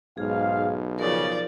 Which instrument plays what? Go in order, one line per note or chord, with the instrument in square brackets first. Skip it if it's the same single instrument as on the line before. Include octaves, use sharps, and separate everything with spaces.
[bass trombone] B1 [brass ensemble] G#2 F5 [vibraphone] G#4
[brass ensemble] C#3 [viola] F3 D5 [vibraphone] A#4